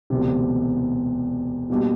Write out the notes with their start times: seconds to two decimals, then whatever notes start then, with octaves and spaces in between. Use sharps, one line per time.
0.10 E1 D2 C3
1.70 B2 G3 A#3 D4 G4